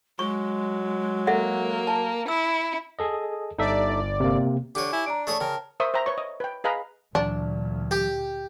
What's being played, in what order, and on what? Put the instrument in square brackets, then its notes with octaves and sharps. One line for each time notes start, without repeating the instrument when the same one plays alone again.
[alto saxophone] F#3 [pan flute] G#3 [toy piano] C#6
[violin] A#3 [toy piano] A4 E5 F#5
[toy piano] A5
[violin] E4 [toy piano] E6
[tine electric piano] G#4 A4 D#5
[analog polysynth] G1 D5 [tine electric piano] D#4 A4 E5
[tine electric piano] C3 A#3
[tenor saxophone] D3 [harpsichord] G4 C#5
[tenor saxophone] E4 [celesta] G#5
[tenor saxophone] D4 [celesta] A#5 D7
[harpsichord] A3 G#4 C#5 [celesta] D5
[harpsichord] C#3 [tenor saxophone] A#4 [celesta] G5 A5
[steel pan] A#4 C5 E5 C#6 D#6
C5 E5 G5 A#5
B4 C#5 C#6
D#5
B4 G5
G#4 B4 D#5 F5 A#5 B5
[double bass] D2 A#2 [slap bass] E3 F#3 [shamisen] D4
[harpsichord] G4